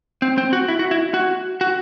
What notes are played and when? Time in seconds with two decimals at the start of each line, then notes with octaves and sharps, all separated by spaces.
0.22 C4
0.38 C4
0.53 F#4
0.68 E4
0.79 F#4
0.91 E4
1.14 F#4
1.61 F#4